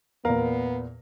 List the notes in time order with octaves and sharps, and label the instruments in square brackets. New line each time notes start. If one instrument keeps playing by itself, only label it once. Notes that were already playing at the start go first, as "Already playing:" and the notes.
[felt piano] E2 A#2 [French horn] B3 [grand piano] A#4 F5 A#5